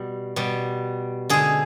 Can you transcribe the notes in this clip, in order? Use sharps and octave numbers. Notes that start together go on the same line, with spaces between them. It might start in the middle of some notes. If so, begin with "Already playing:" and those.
Already playing: B2 G3
B2 G3
D3 G#3 G#4